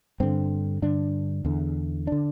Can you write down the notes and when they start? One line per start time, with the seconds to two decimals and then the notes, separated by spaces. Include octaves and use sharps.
0.20 G2 D3 C4
0.82 G2 D3 D4
1.45 E2 D3
2.07 D3 D4